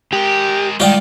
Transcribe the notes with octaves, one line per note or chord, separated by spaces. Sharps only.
G#3 G4 A#4
D#3 G3 G#3 F4 D5 G5